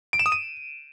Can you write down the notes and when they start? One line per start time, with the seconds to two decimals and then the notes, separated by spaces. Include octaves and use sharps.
0.13 D7
0.19 E7
0.26 D#6
0.32 D#7